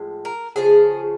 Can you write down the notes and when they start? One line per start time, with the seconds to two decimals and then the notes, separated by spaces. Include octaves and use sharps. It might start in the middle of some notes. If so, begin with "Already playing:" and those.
Already playing: A2 F3 G#3
0.25 A#4
0.56 C#3 F3 A3 G#4